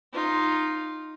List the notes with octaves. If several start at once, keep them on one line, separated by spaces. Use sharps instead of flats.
D#4 F4